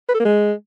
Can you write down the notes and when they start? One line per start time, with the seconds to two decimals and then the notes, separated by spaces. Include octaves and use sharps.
0.09 B4
0.14 A4
0.20 A#3
0.25 G#3